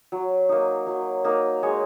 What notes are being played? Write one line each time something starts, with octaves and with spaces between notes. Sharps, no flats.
F#3
A#3 D#4
F#3
A#3 D#4
G#3 C#5